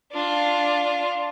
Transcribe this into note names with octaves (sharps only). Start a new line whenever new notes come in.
D4 F4